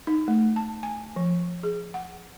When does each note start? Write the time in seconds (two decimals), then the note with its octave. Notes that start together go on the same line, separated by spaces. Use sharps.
0.07 D#4
0.28 A3
0.56 A5
0.83 G#5
1.16 F3
1.63 G#4
1.94 F#5